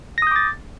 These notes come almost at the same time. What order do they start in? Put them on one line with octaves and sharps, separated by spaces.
A#6 D#6 G6 D6 A6